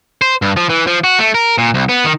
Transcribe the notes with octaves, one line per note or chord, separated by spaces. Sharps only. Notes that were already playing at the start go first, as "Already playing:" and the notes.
C5
G2
F3
E3
F3
F#4
A3
A#4
A#2
C2
B3
D#3